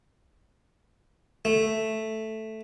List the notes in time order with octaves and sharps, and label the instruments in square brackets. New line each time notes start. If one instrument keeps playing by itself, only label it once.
[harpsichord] A3